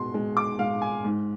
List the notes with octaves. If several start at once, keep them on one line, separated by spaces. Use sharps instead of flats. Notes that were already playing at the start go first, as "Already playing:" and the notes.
Already playing: B2 G#3 C6
G#3
D6
G#3 F5
G#5
G#2